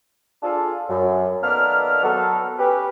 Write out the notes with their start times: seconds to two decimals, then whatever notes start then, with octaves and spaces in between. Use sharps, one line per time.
0.43 D4 F4 G#4 A4
0.88 F#2
1.43 D#3 A#3 B3 A4 D5 F6
2.03 F#3 B3 A4
2.58 C#4 G4 B4